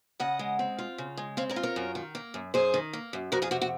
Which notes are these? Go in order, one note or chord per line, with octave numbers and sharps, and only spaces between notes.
C#3 D#5 F#5
G#3
C4
F4
C#3
G#3
C4 C#5 F5
A#4 C#5
F4
A#4 C#5
F#2
D#3
A#3
F#2
F#2 G#4 C5
D#3
A#3
F#2
F2 F#4 A#4
F4 G#4
C3 F#4
F#4